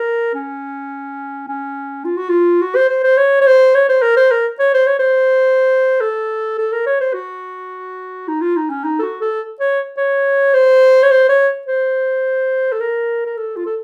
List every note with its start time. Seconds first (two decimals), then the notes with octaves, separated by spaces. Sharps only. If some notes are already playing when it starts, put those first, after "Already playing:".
Already playing: A#4
0.34 C#4
1.48 C#4
2.05 F4
2.17 F#4
2.29 F4
2.62 F#4
2.76 C5
2.90 C5
3.04 C5
3.17 C#5
3.41 C#5
3.47 C5
3.75 C#5
3.89 C5
4.02 A#4
4.17 C5
4.31 A#4
4.60 C#5
4.74 C5
4.87 C#5
4.99 C5
6.01 A4
6.58 A4
6.72 A#4
6.87 C#5
7.01 C5
7.14 F#4
8.28 D#4
8.41 F4
8.56 D#4
8.70 C#4
8.84 D#4
8.99 A4
9.02 F#4
9.21 A4
9.60 C#5
9.97 C#5
10.54 C5
11.03 C#5
11.11 C5
11.29 C#5
11.67 C5
12.72 A4
12.80 A#4
13.26 A#4
13.37 A4
13.56 F4
13.66 A4